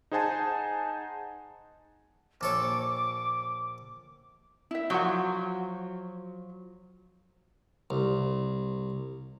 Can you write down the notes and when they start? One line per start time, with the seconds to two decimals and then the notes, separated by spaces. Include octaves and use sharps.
0.11 D#4 G#4 C5 F#5 G#5 A5
2.41 A#1 A4 C#5 D6
4.71 E4 E5
4.90 F3 F#3 F#4 F#5
7.90 C2